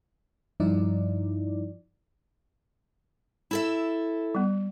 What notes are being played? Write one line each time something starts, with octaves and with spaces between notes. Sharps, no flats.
G2 F3 D#4 E4 D5
E4 A4 E5
G3 B3